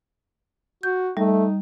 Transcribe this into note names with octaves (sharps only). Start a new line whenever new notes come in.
F#4 G6
G3 A3 D#4